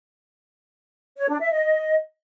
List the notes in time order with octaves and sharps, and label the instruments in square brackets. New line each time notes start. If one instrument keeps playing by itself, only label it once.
[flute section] C#5
D4
E5
D#5